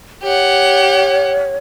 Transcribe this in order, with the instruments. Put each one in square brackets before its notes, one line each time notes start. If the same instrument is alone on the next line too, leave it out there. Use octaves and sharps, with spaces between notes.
[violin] G4 F#5 [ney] C#5